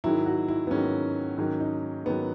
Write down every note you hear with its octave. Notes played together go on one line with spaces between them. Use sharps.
G#2 D#3 F#3 E4
F#4
E4
B3
G#2 D#3 F#3 C#4
G#2 D#3 F#3 C#4
D#4
G#2 D#3 F#3 B3